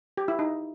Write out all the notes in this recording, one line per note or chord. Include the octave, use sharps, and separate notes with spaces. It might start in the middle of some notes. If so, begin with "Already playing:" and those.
G4
E4
D#4